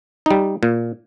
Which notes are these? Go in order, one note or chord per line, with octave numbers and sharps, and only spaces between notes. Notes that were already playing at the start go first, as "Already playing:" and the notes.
G3 D#4
A#2